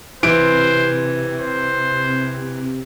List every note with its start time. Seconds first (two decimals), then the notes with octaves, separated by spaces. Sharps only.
0.23 C3 E3 C5 D7
1.38 C5